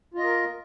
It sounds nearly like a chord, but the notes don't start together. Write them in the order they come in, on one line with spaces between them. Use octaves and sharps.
F4 D#5 A#4